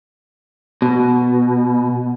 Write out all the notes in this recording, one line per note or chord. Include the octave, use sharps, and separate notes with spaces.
B2